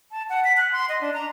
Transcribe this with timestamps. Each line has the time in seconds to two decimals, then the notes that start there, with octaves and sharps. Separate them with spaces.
0.11 A5
0.30 F#5
0.44 B6
0.57 F#6
0.73 C6
0.89 D#5
1.01 D4
1.13 A#5